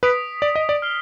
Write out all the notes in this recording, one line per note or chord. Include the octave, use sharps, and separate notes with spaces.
B4 D#6 B6 D7
D5
D#5
D5
F6 C7 G7